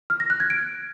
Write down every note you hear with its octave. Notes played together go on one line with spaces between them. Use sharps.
F6
A#6
F#6
G#6
D7